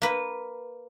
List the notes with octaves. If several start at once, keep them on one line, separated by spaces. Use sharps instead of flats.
A#3 B4